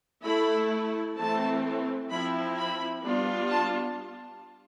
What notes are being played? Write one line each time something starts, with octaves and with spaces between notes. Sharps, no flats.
A3 E4 B5
E3 A3 C4 A5
F3 C4 E4 B5
B5
G3 B3 D4 F4
A5